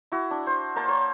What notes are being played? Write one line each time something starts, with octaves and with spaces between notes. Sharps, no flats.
E4 F#4
D4
C5
A#3 A#4 C5 A5
C5 C#5